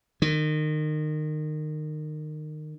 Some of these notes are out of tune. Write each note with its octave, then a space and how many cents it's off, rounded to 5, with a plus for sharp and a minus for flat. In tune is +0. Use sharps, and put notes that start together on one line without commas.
D#3 -25